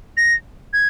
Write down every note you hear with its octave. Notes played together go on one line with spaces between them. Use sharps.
A#6
G#6